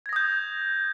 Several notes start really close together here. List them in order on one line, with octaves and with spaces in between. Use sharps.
G#6 A#6 D#6 G6